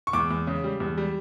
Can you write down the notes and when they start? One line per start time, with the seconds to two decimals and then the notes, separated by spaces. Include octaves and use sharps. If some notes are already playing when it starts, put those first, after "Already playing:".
0.07 C#6
0.13 E2 D6
0.31 E2
0.47 C#3
0.64 G3
0.80 E2
0.98 G3